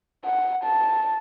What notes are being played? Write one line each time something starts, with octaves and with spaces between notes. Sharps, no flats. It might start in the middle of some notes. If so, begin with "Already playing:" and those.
F#5
A5